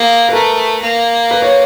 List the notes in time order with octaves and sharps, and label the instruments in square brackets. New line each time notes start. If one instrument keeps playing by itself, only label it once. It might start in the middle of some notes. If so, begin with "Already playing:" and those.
Already playing: [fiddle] A#3 [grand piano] G#4
[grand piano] B4
[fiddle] A3 [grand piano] A#4
[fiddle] A#3
[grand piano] B4
C#5